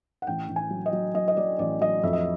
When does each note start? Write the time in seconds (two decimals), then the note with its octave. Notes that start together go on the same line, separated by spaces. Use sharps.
0.22 F#5
0.27 A1 G5
0.49 A1
0.56 G#5
0.70 F#3
0.86 D#5
0.93 F#3
1.15 F#3 D#5
1.28 D#5
1.37 F#3 D5
1.59 A1 D5
1.81 F#3 D#5
2.03 F2 E5
2.13 D#5